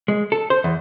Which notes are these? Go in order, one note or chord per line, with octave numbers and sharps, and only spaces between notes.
G#3
A4
C5
E2